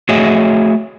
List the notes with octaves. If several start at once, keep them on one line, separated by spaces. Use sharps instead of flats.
A3 F#4 G#4 C#5 D#5 E5